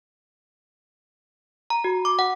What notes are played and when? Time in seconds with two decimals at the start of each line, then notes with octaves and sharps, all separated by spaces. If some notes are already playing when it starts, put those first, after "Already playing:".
1.70 A#5
1.84 F#4
2.05 D6
2.19 F#5